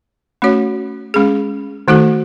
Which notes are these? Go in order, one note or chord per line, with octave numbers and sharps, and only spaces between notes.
A3 C#4 F#4 C#5
G#3 C#4 G#4
D#3 A3 D#4 F#4 A4